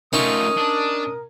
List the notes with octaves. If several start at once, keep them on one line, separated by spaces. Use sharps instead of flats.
A3 C#4 D#4 F4 A#4 C#6 D#6
D4